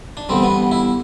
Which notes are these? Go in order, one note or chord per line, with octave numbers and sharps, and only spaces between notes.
D4
E2 D3 G3 C4
B3
E4